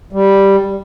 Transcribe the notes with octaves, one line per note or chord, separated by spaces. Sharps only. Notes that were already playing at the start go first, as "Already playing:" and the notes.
G3